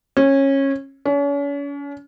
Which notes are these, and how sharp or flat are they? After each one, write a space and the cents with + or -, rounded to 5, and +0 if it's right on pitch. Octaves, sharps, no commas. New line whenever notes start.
C#4 -20
C#4 +40